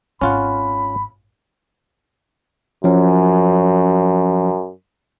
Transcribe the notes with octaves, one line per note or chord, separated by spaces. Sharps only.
G#1 C#4 F4 F#5 B5
F#2 F3 C#4